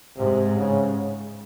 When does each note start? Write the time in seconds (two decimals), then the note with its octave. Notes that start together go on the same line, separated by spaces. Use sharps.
0.18 G#2 C3
0.56 C#3